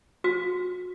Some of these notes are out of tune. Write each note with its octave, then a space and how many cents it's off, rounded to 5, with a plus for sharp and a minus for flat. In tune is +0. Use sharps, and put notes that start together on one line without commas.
F#4 -35